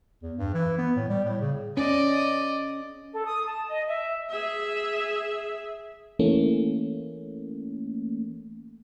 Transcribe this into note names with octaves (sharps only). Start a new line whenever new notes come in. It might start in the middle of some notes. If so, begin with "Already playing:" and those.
E2
G2
E3
B3
A2
G3
A2
C#3
C#4 D5 D#5
A4
D#6
A5
D#5
E5
G#4 E5
E3 A3 A#3 C#4